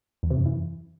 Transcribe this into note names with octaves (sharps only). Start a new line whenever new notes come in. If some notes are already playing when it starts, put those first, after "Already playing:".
E2
C3
F#2
E3